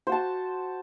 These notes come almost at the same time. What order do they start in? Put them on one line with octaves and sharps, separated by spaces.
C5 F#4 A5